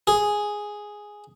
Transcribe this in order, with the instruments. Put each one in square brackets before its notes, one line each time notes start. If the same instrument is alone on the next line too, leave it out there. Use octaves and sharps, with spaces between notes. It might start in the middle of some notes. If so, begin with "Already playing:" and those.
[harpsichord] G#4